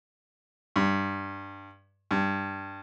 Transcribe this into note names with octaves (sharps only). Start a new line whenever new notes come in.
G2
G2